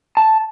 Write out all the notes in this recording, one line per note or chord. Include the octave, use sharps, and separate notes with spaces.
A5